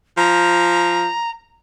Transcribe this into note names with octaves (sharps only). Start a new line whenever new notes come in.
F3 A#5